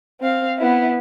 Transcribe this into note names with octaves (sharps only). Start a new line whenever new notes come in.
C4 F5
B3 E4